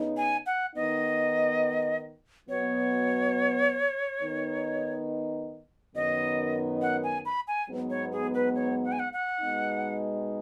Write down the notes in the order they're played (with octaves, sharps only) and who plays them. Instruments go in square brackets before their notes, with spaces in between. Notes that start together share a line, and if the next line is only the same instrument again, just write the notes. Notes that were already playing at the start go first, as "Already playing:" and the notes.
Already playing: [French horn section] C#3 B3 D#4
[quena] G#5
F#5
[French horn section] D#3 B3 D#4 [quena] D#5
[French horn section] B2 F#3 B3 [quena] C#5
[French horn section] D#3 B3 D#4
[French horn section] F#2 D#3 B3 D#4 [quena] D#5
[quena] F#5
G#5
B5
G#5
[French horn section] G#2 F#3 B3
[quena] C#5
G#4
B4
C#5
F#5
G#5
F#5
F#5
[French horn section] B2 G#3 B3 D#4